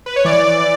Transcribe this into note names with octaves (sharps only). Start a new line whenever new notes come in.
B4
C#5
E3 D5
E3